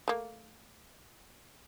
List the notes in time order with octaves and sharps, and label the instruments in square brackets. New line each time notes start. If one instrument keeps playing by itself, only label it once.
[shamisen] A3 A#3